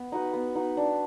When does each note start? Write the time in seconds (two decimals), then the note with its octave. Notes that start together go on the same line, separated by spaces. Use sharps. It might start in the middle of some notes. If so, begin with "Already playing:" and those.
Already playing: B3
0.12 D#4 F#4 B4
0.34 B3
0.55 D#4 F#4 B4
0.77 D4